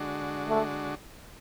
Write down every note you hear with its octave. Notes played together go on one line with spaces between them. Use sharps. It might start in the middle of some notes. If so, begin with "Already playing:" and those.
Already playing: D3 G#3 D4 F#4
A3